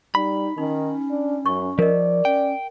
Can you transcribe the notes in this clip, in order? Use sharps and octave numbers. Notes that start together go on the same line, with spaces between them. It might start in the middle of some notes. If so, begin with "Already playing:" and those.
G3 D#4 B5
D#3 C#4 D#4
D4
F#2 C#6
F3 A#4 D5 D#5
C#4 G5